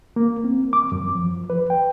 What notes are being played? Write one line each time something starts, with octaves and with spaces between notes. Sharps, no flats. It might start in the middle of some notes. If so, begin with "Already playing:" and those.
A#3
C4
D6
F#2
F3
B4
G5